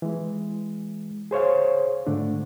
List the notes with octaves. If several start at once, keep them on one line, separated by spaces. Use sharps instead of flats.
E3 G#3
G#4 C5 C#5 F5
G#2 D3 A3 D4